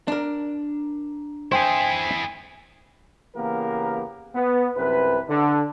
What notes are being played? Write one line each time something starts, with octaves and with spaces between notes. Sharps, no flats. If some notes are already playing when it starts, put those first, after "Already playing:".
D4 A#4
E4 G#4 C5 G5 G#5
C#3 E3 A#3 B3 G4 A#4
B3
C2 F#2 C3 B4
D3